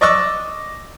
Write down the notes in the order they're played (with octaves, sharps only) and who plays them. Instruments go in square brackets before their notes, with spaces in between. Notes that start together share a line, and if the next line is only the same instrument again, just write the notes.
[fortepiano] D5 D#5 C#6 D6 E6